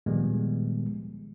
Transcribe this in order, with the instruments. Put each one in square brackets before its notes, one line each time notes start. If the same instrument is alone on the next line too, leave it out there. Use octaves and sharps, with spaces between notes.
[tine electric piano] A#2 D#3 F3 G3 G#3 B3